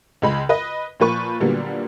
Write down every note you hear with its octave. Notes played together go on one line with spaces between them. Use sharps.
C#2 G#3 B5
B4 D#5
A#2 F3 B4 C#6
A#2 D3 F#3 G3 A#3 B3